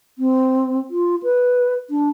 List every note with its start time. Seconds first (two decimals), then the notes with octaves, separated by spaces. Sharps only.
0.18 C4
0.90 F4
1.23 B4
1.90 D4